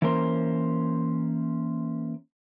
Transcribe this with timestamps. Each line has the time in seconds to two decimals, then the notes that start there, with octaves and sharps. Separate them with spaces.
0.02 E3 A#3 C#4 A#4 C5